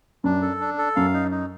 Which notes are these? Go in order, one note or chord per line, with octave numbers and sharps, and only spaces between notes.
F#2 D4
A4
D4
A4
F#2 F5
D#4
D#4